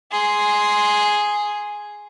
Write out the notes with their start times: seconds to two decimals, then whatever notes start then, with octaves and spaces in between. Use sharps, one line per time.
0.12 G#4 C6